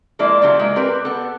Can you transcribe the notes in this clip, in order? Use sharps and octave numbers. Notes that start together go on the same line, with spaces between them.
F3 G#3 A#3 E4 D5
C#3 F3 F#3 G4 G#4 E5
G#3 A#3
C4 G4 A#4 B4
B3 A4